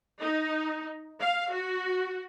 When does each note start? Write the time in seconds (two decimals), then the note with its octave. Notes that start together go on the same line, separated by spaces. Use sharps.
0.20 D#4
1.20 F5
1.52 F#4